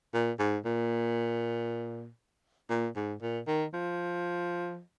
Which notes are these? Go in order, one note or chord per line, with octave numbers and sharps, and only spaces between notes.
A#2
G#2
A#2
A#2
G#2
A#2
D#3
F3